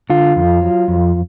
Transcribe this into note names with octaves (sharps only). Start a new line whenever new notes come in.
D3 F4
F2
F#3
F2